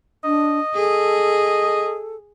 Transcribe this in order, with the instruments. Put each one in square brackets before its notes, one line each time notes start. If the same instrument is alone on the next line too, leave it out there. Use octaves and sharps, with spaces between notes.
[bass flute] D4 [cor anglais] D#5
[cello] G#4 [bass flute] A4